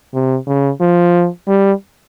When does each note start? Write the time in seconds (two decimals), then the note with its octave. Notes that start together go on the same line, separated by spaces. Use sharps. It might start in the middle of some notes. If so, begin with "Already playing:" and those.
0.14 C3
0.47 C#3
0.81 F3
1.48 G3